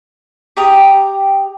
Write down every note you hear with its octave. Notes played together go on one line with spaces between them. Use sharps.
G4 G5 A#5 D#6